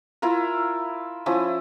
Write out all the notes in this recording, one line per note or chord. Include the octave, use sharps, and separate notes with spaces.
E4 F4 A#4
F3 C#4 E4 D#6